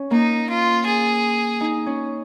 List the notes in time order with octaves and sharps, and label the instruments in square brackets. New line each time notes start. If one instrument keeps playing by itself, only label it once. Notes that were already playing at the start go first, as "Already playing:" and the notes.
Already playing: [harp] C#4
[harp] A#3 [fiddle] D#4
[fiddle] F4
G#4
[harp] D#4
C#4